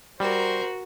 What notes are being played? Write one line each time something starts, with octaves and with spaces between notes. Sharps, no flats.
G3 F#4 A#4 C5